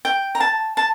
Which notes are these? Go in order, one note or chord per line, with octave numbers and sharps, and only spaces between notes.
G5
A#5
A5
A5